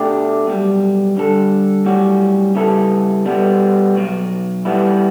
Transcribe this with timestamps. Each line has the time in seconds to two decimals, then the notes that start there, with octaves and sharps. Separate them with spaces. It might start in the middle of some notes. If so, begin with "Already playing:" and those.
Already playing: B2 A3 D4 G4
0.46 B1 B2 G3
1.16 G2 D3 G3 D4 A4
1.85 B1 A2 G3 C#4 F#4
2.55 C#3 G3 B3 E4 A4
3.26 B2 G3 B3
3.95 B1 B2 F#3
4.65 E3 G3 B3 E4